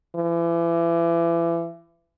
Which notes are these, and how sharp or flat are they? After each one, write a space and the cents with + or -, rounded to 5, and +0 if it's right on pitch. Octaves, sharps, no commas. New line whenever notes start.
E3 +35